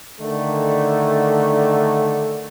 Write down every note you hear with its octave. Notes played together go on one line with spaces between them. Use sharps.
D3 D#3 A3